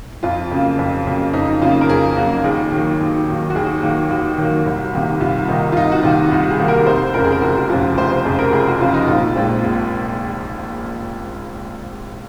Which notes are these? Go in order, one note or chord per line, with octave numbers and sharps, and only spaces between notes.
F2 F4
C#3 F#3 A#3
F2
C#3 F#3 A#3
F2 D#4
C#3 F#3 A#3 F4
A#4
F2 G#4
C#3 F#3 A#3 F#4
D#2 G#4
D#3 F#3 A#3
D#2
D#3 F#3 A#3
F#4
D#2 G#4
D#3 F#3 A#3
D#2 F#4
D#3 F#3 A#3
C2
C3 D#3 A#3
C2 F4
C3 D#3 A#3 D#4
F4
C2 D#4
F#4
C3 D#3 A#3 F4
C2 F#4
G#4
C3 D#3 A#3
A#4
F1 C5
F2 C#3 F3 A#4
G#4
A#4
F1 F#4
F2 C#3 F3 F4
F1 C5
C5
F2 C#3 F3 G#4
A#4
F1 G#4
F#4
F2 C#3 F3 F4
D#4
A#1 F4
A#2 G#3 C4 F4
A#1